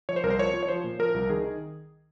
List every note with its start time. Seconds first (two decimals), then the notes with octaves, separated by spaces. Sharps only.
0.09 F3 C#5
0.16 C5
0.23 C2 A#4
0.30 C5
0.39 F3 C#5
0.54 F3
0.63 C#5
0.68 F3 C5
0.84 A#2
0.99 F3 A#4
1.14 C2
1.30 D#3 G#4
1.44 D#3